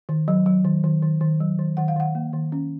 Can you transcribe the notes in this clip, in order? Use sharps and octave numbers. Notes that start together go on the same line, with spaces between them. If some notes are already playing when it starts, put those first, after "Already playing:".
D#3
F#3
F#3
D#3
D#3
D#3
D#3
F#3
D#3
D#3 F#5
F5
D#3 F#5
A#3
D#3
C#4